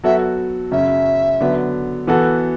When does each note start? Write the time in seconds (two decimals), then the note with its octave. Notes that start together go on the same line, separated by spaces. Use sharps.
0.03 F#3 B3 F#4 A4 E5
0.71 F#2 C#3 F#3 C#4 E5
1.40 D3 F#3 B3
2.07 E3 B3 F#4 A4